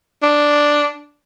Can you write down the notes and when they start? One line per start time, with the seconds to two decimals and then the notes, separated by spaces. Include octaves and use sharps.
0.22 D4